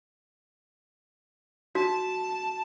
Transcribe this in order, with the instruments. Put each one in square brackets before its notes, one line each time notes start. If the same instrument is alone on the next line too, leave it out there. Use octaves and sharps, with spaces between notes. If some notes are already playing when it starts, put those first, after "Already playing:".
[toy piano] F#4 [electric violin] A5